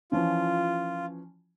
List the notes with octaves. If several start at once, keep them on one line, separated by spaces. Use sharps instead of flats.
E3 F3 C#4 F4